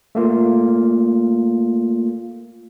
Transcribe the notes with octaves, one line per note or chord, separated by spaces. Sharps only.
A3 A#3 F4